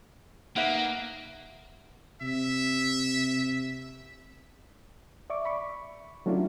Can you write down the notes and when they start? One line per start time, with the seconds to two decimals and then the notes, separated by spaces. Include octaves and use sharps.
0.56 A#3 D#4 B4 E5 F#5
2.22 C3 E5
5.30 D5 E5 C#6 D6
5.45 B5 C#6
6.26 F#3 A3 C#4 D4 E4 F4